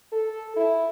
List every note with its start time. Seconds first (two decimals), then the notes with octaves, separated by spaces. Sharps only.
0.12 A4
0.56 E4